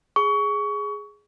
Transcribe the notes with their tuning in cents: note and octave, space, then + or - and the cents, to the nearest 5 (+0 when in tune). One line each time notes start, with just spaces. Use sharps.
G#4 +0 C#6 +25